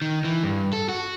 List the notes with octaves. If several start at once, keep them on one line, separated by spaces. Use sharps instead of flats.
D#3
E3
G2
A4
F#4